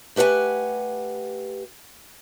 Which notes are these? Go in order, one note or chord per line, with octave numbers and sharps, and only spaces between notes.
A3 G4 B4 F#5 G#5